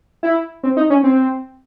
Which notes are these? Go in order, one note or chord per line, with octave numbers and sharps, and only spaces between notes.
E4
C4
D#4
C#4
C4